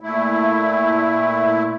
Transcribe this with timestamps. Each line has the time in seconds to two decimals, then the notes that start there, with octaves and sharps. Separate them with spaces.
0.01 A#2 A3 E4